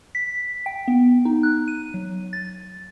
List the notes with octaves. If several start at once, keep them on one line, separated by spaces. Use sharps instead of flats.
B6
G5
B3
D#4
F#6
D#7
F#3
A6